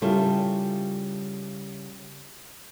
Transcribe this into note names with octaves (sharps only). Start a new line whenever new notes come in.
C#3 G3 E4 F4 A4 A#4